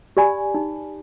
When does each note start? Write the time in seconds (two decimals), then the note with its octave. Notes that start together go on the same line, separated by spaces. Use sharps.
0.17 G4 D5 G#5 B5
0.54 D#4